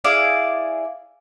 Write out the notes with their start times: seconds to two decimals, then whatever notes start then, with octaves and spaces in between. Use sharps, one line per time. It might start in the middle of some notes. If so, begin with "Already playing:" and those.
0.04 E4 G#4 D5 F5